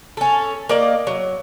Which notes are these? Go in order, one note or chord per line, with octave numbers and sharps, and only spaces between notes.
C#4 A4
A#3 D5 D#5
F#3